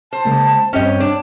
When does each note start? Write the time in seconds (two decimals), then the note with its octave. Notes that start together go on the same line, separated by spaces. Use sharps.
0.13 C5 A5
0.25 C#3 G#3 A#3
0.73 G2 C4 C#4 G4 C#5 D#5
1.00 D4